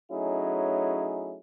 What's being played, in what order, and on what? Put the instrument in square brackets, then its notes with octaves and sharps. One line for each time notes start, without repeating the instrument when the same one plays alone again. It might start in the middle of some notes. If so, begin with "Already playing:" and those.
[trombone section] F#3 A3 C#4 D#4 E4 G#4